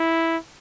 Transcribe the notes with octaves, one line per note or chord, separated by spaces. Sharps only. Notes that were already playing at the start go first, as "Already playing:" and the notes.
Already playing: E4